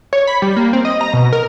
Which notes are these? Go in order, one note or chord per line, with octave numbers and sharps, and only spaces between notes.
C#5
B5
G3
A#3
C4
D#5
A#5
B2
A#4